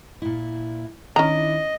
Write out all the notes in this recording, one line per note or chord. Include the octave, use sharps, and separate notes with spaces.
A#2 E4
D#3 C#4 D4 E4 D#5 A#5